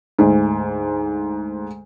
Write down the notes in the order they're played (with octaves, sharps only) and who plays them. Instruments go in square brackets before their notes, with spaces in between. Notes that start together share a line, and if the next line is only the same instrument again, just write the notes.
[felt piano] D2 G#2